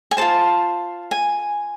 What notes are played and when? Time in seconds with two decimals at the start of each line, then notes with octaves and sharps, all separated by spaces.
0.11 G#5
0.17 F4 A4 C5 A5
1.11 G#5